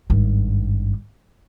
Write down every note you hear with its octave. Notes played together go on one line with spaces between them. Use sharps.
G#1 G2